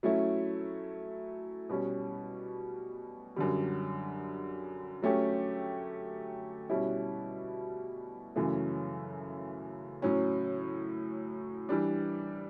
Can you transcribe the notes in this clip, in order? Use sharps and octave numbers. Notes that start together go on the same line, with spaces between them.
F#3 A3 C#4 E4
B2 G3 C#4
F#2 D3 G3
F#3 A3 C#4 G4
B2 G3 C#4 E4
F#2 C#3 E3 A3
A2 F#3 C#4
E3 G3 D4